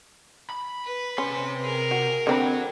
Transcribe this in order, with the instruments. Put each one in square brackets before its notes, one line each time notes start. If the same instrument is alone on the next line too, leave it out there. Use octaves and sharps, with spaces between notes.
[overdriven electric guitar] B5
[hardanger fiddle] B4
[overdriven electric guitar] C3 C6 [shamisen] C#4
[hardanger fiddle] G#4 A#4
[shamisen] F#4
[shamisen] D3 C4 B5 [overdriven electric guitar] F#4 C#5